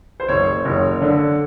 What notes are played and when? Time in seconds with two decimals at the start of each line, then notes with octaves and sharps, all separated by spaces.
0.20 C5
0.28 F#1 C#5
0.65 F#1
1.02 D3